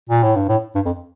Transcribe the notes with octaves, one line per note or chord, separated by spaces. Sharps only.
A#2
A2
G2
A2
G2
F2